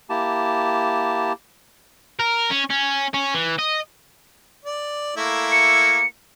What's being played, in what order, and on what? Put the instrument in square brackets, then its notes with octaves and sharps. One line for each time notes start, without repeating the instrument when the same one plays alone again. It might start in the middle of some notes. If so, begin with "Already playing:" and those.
[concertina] A#3 E4 G4 A5
[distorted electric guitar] A#4
C#4
C#4
C#4
E3
D#5
[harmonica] D5
A3 A#3 E4
[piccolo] C#7